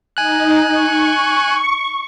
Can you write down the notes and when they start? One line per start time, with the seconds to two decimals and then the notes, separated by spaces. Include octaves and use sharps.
0.17 D#4 G#5 F#6
0.67 C#6